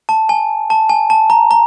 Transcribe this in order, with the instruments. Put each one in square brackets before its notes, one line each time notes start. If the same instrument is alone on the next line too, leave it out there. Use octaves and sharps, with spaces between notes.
[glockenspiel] A5
G#5
A5
G#5
A5
A#5
A#5